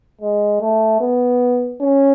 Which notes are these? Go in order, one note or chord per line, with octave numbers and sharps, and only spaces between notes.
G#3
A3
B3
C#4